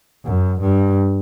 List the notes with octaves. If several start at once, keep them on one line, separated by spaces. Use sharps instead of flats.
F#2
G2